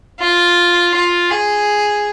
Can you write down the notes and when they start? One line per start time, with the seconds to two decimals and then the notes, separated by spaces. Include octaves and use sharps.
0.20 F4
0.94 F4
1.31 G#4